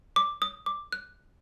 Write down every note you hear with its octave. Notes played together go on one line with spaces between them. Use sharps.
D6
D#6
D6
F#6